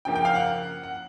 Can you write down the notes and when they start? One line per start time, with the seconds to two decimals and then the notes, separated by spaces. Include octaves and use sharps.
0.05 C#3 F3 A#3 G5
0.15 G5
0.25 F5
0.35 F#5
0.83 F#5